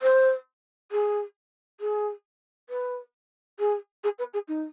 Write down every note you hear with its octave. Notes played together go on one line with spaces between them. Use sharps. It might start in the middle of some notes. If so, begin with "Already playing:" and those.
C5
G#4
G#4
B4
G#4
G#4
B4
G#4
D#4